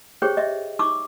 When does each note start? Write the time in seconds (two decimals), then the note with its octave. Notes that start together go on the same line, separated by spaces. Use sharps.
0.22 G4 G#4 C5 C#5 G5
0.37 D#5 E5
0.79 D#4 C#6 D6 E6